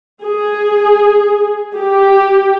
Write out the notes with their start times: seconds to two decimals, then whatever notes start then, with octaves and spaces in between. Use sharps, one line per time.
0.24 G#4
1.77 G4